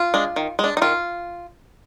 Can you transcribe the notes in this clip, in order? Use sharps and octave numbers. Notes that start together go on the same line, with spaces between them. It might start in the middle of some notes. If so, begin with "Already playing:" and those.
Already playing: F4
G#3 D4
D#3
G#3 D4
D#4
D#3 F4